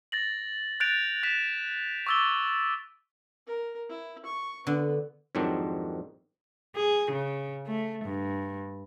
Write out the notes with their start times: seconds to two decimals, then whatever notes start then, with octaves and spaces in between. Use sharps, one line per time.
0.12 A6 A#6 F#7
0.80 F#6 G6 A6 D7 F7
1.23 F#6 B6 E7
2.07 C#6 D6 E6 A6 G7
3.47 A#4
3.89 E4
4.25 C#6
4.67 D3 B3
5.35 F2 G#2 D#3 F#3 C4 D4
6.75 G#4
7.11 C#3
7.66 A3
8.05 G2